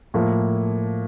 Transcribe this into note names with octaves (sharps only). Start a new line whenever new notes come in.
A2 F3 A#3 F4